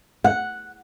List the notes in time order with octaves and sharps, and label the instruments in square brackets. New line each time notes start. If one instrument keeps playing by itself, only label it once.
[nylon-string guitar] F#5